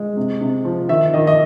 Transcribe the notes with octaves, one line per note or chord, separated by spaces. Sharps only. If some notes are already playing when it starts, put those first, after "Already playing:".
Already playing: G#3
C3
C3
F3
D#3 E5
D#3 D#5
D#5